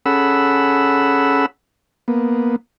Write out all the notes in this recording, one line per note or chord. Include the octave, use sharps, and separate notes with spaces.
C#4 G#4 A4 F#5 B5 E6
A#3 B3